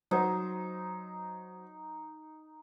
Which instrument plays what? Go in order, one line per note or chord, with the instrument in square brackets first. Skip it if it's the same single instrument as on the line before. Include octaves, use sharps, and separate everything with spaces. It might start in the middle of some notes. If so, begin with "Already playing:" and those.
[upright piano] F#3 C5 [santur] D#4